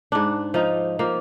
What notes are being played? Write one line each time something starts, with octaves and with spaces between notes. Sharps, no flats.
G#2 D4
F3 D#4
F3 A#3